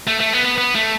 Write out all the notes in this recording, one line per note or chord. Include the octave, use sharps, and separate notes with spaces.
A3
A3
B3
B3
B3
A3